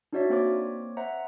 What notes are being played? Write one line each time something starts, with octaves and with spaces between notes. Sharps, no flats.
D4 D#4 F#4 C#5 D5 E5
A#3 C4 C5 C#5 D6
C5 E5 F#5 A#5